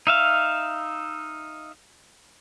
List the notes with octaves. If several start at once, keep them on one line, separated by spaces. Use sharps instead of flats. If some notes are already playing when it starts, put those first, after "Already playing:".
D#4 E5 F5